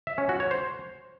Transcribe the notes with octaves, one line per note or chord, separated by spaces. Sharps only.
E5
C#4
F#4
C#5
C5